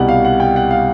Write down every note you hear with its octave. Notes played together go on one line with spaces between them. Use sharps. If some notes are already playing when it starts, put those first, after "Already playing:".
Already playing: C2 B2 G3 F#5
F5
F#5
G5
F#5
F5